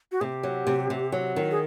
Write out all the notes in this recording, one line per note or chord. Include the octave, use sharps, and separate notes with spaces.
F#4
C3 G4 G#4
F#3
C3
C3
F#3
D#3
G#4